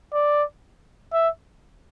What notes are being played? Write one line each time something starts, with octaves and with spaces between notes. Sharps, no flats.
D5
E5